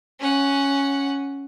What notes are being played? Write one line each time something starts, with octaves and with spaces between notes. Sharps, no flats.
C#4 F#5